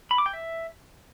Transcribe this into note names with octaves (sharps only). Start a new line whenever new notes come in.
B5
D6
G5
E5